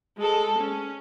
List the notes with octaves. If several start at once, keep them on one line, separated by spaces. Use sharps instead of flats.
G#3 A4
C#4